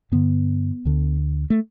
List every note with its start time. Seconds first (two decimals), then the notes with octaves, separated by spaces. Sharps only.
0.12 G2 D3 B3
0.85 D2 D3
1.50 A3